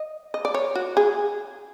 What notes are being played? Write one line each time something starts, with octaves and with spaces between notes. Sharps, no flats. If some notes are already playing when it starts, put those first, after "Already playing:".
Already playing: D#5
D#5
D5
C#5
F#4
G#4